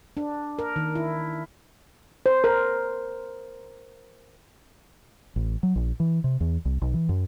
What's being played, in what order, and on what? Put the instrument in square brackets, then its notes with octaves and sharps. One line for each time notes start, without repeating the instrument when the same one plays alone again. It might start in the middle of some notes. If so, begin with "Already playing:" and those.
[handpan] D4
A#4
D#3
E4
C5
A#4
[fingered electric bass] A1
F#3
A#1
E3
C3
E2
C2
B1
E3
F#2